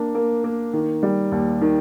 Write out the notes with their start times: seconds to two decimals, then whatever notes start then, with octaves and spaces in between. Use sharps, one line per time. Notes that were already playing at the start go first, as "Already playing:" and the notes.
Already playing: A#3 D4
0.15 A#3
0.44 A#3
0.73 D#3
1.03 G3
1.32 D#2
1.61 D#3